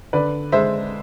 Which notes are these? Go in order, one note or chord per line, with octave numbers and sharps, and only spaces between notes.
D3 B4 D5
G#3 C5 E5